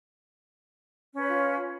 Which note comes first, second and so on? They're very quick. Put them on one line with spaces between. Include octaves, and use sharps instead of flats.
C#4 B4 C#5 F4